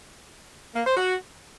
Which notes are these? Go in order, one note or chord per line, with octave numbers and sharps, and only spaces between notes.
A#3
C5
F#4